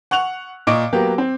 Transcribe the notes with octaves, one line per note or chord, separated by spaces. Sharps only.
F#5 C#6 F#6 F7
A#2 D#5 C#6 D6 D7
F#3 A#3 B3 G4
C4